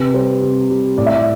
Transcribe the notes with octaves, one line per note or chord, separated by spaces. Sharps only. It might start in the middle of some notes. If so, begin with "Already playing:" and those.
Already playing: C3 B4
G3 C5
C3
G3
A2 D5
E5
D5